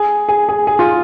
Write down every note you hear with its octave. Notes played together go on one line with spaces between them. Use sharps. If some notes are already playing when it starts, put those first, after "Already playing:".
Already playing: G#4
G#4
G#4
G#4
F4